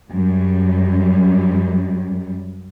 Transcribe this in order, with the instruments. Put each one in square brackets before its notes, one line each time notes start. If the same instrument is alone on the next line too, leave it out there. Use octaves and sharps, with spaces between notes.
[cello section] F#2 G3